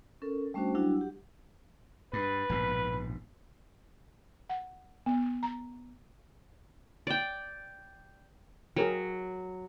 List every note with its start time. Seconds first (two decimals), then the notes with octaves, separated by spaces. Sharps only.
0.22 C#4 A4 A#4
0.54 G3 A3 C#4 D4 F#4 C5
0.75 F#3 G3 D4 E4 F#4
0.97 G4 F#5
2.13 G2 B4
2.49 A#1 G#2 B2
4.50 F#5
5.06 B3
5.43 A#5
7.07 D5 G5
8.76 F#3 G#4 A#4 G5